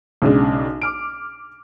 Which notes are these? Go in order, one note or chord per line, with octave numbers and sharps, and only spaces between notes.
B1 C#3 G#3 D4
D6 F6 D7